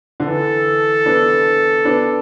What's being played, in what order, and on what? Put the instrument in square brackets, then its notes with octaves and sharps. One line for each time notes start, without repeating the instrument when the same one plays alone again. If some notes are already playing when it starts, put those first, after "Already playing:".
[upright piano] D3
[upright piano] E3 [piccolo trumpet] A4
[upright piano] B3 D4
B3 D4